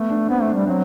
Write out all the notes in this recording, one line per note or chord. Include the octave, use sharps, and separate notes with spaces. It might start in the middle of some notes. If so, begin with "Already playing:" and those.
Already playing: A3 B3
D4
B3 C4
A3
D4
G3
F#3 C4